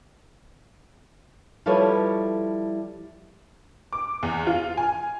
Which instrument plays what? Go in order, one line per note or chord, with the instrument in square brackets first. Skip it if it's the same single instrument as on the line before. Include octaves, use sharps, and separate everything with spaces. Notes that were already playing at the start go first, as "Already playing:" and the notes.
[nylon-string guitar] F3 G3 E4 A4 B4 C#5
[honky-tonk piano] D6
E2
F4
G#5